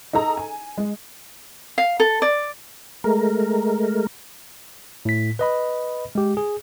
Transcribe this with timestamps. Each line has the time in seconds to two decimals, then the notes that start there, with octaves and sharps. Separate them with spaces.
0.13 D#4 G#4 A4 A#5
0.37 G#5
0.78 G#3
1.78 F5
2.00 A4
2.22 D5
3.04 G#3 A3 A#4
5.05 A2 B6
5.39 B4 D#5 B5
6.15 G#3 G4
6.37 G#4